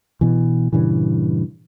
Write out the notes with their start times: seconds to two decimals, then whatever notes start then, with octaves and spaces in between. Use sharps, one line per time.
0.21 B2 E3
0.73 G2 A#2 C#3 E3